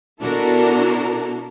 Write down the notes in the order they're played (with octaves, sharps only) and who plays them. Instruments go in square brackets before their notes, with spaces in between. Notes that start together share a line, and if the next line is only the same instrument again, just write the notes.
[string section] B2 D4 E4 F#4 A4 A#4